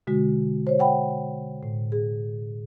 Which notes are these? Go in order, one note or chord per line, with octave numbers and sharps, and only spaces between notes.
B2 D3 G#3 F#4
C5 C#5
F#5 G5 B5
A2
G#4